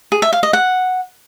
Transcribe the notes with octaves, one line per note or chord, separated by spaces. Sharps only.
G#4
E5
F5
D#5
F#5